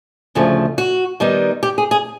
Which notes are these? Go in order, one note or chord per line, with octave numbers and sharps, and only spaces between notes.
D2 C#3 F3 A3
F#4
D#3 G3 B3 D#4
G4
G#4
G#4